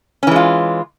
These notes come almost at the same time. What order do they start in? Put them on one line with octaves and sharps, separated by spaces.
C#4 E3 G#3 F4